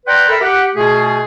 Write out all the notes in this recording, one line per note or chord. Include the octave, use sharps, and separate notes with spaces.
B4 D5 F#5 G5 A#5 C6
A4 A#4 E5 A#5 B5
G4 F#5
B2 A3 F4 G#4